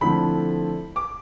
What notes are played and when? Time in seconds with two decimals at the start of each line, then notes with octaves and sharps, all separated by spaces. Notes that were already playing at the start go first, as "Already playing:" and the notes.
0.01 D3 F3 A3 C4 E4 B5
0.96 D6